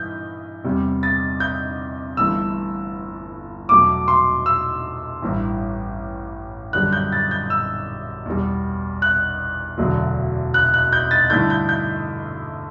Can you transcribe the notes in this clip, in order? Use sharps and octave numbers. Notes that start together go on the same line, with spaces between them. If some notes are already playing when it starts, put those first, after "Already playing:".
Already playing: G2 E3 G6
E2 C3 G3
A6
G6
G1 G2 E3 A3 E6
E2 B2 F#3 A3 D6
C6
E6
A1 G2 E3
F#2 D3 G3 F#6
G6
A6
G6
E6
E2 B2 G3
F#6
E1 D2 D3 F#3
F#6
F#6
G6
A6
G2 D3 A3 E4 G6
G6
G6